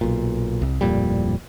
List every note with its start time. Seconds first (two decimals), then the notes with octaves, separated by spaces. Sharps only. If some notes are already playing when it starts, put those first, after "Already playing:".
0.01 B1 A#2
0.62 C2
0.81 D1 F2 A#2 G3